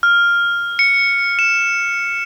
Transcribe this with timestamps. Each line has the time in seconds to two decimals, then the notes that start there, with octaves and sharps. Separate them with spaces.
0.03 F6
0.79 C#7
1.39 E7